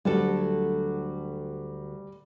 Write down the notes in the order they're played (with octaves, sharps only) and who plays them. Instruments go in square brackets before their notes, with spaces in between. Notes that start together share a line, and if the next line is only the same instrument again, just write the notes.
[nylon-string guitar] D2 F#3 A4 [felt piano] G3